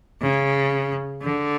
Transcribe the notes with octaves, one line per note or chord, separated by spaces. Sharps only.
C#3
D3